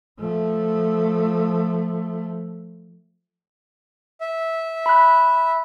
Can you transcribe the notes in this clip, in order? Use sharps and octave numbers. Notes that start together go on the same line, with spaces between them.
F3 A3
E5
B5 F#6